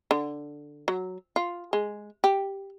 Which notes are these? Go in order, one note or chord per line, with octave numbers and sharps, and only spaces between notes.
D3
F#3
F4
G#3
G4